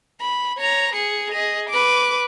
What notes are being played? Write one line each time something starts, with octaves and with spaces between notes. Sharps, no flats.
B5
C#5 A#5
G#4 C#7
G#4 D#5
B4 D6